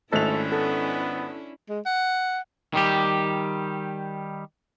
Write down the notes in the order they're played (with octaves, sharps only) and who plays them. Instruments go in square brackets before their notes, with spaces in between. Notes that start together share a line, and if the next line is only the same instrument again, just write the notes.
[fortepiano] G#1 [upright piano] A3 F7 [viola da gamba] C#4 D4 E4 [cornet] A4
[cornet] B3 [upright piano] A4
[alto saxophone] G#3
F#5
[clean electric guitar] D#3 G3 G4